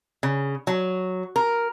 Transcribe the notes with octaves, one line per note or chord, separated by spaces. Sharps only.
C#3
F#3
A#4